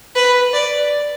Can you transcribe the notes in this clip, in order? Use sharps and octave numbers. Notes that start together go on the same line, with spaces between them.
B4
D5